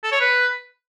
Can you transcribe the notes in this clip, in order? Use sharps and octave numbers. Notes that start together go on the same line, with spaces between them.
A4
C#5
B4